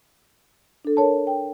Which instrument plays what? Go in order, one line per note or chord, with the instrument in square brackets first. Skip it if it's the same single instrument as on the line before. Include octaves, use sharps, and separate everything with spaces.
[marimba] D4 A4
A#4 C#5 A5
G5